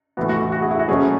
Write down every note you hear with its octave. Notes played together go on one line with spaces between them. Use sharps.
A2 E3 B3 F#4
F#4
F#4
F#4
G#4
E4
F#4
B2 F#3 A3 C#4 G#4